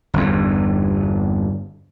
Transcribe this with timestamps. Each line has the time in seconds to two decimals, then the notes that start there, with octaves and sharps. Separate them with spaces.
0.14 G1 E2